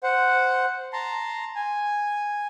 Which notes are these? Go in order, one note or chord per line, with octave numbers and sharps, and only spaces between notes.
C5 F#5
A5 A#5 C6
G#5